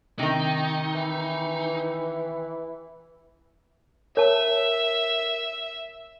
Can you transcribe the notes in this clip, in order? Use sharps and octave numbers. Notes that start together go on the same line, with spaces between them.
C3 D#3 D#4
E3
A#4 C#5 E5 A5